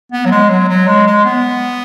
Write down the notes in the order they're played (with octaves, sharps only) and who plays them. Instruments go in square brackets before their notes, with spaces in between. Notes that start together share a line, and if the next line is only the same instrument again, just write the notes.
[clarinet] B3
F#3
G#3
F#3
F#3
G#3
G#3
B3